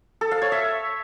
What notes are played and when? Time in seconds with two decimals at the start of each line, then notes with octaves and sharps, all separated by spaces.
0.21 A4
0.31 F5
0.42 C#5
0.52 E5